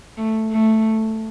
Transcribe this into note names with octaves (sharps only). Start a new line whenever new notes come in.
A3
A3